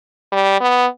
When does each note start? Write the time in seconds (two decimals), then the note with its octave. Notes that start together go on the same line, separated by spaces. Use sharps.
0.32 G3
0.61 B3